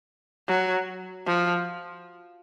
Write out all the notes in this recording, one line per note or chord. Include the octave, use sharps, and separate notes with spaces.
F#3
F3